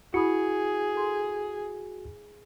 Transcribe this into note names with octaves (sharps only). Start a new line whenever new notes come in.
E4 F#4 G#4 B5 D#6 C#7
A4 C6